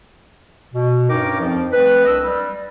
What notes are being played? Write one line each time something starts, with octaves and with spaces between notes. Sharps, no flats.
B2
G2 C#4 D#4 A#4 G5 D6
F2 F3
F3 A3 C4 B4
C2 D4 B4 D#5 E6
G3